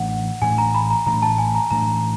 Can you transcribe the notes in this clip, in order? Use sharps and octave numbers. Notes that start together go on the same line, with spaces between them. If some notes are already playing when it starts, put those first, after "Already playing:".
Already playing: A2 E3 A3 D4 F#5
A2 E3 A3 D4 G#5
A#5
B5
A#5
A2 E3 A3 D4 A#5
A5
G#5
A#5
A2 E3 A3 D4 A#5